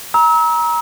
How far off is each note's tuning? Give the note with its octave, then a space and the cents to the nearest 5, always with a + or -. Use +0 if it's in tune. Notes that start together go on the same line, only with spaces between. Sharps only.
A#5 +25 E6 -35